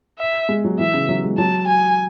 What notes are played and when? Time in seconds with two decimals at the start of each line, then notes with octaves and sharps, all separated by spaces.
0.19 E5
0.49 G#3
0.65 F#3
0.79 E3 E5
0.94 C#3
1.09 F#3
1.24 G#3
1.38 F#3 A5
1.68 G#5